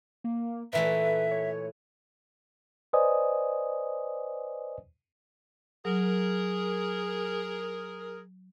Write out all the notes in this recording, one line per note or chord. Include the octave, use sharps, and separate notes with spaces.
A#3
A#2 E3 A3 B4 E5
C#5
B4 C5 D5 D#5 G#5 D#6
F#3 G#4 A#4